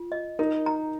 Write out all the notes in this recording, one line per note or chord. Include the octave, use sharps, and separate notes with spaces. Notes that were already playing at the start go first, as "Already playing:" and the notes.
Already playing: F4
D#5
D#4 A#4
A#5